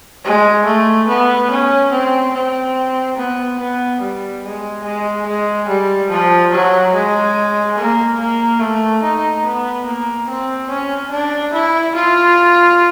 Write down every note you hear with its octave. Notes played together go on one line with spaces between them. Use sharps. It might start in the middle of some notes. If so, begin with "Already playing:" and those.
G#3
A3
B3
C#4
C4
C4
B3
B3
G3
G#3
G#3
G#3
G3
F3
F#3
G#3
A#3
A#3
A3
D#4
B3
A#3
C4
C#4
D4
E4
F4